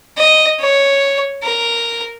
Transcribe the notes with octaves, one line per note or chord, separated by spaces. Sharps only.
D#5
C#5
A#4